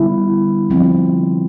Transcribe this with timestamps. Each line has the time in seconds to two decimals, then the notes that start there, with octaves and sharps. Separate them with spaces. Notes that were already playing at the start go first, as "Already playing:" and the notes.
Already playing: D3 G3 B3 E4
0.70 D3 F3 C4